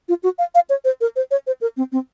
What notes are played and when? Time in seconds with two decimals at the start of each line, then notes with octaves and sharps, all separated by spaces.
0.08 F4
0.23 F#4
0.38 F5
0.55 F5
0.70 C#5
0.85 C5
1.01 A#4
1.16 C5
1.31 C#5
1.47 C5
1.61 A#4
1.77 C4
1.92 C4